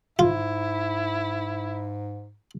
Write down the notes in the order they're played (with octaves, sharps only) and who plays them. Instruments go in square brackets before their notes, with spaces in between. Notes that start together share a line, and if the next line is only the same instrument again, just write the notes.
[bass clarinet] G#2 [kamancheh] E4 [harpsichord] F4